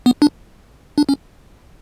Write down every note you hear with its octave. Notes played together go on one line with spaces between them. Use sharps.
B3
D4
D4
C#4